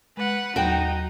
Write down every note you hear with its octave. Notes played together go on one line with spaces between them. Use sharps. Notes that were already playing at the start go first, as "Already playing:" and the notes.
G#3 B4 F#5
D#2 F#3 D#4 F#4 G5